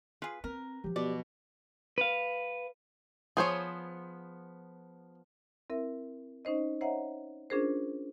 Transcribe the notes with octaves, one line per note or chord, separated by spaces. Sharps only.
F4 G#4 B4
C4 A#4
F3 F#3 G4
B2 D5
B4 F5
F3 B3 G#4 C5 C#5
C4 E4 A#4 E5
C#4 D#4 C5 D#5
C5 C#5 D#5 E5 F#5 A#5
C#4 D4 F4 G#4 A#4 C5